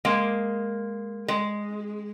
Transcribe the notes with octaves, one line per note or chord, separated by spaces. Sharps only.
G#3 A#3
G#3